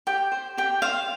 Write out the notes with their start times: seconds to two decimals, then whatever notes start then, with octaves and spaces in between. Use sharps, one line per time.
0.07 G4 G5
0.32 C5
0.57 G4 G5
0.82 C5 F5